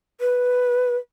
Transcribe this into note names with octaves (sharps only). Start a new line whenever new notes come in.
B4